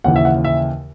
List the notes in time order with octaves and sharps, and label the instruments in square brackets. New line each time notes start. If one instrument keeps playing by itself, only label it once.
[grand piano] D#2 C#3 E3 F#5
E5
F#5
E5